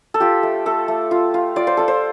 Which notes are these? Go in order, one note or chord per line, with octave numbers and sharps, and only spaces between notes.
A4
F4 G4
A3
A3 A4
A3
F4
F4
F4 D5
C5
F4 A4
C5